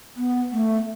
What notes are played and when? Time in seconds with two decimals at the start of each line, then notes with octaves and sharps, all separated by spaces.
0.17 B3
0.52 A3